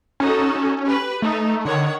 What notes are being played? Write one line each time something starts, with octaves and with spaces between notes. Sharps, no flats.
C#4 D#4 F#4 A4
C#4
G4 B4
A3 D#4 A4
D3 D#3 C#5 F#5